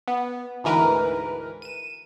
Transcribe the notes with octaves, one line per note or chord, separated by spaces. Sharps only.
B3
D2 G#2 E3 A#4 B4
D#7 E7